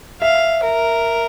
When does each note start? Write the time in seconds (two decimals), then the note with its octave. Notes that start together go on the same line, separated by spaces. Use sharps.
0.21 E5 F5
0.64 A#4